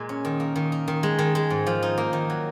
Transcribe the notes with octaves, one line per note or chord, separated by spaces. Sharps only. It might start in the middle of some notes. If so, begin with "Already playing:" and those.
Already playing: A#2 G#3
C#4
D#3
A#3
D#3
D#4
D#3
G#3
D#3
G#3
G#2
F3
D#4
A#3
D#3
F#3